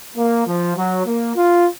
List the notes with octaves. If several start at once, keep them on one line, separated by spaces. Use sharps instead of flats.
A#3
F3
F#3
A#3
F4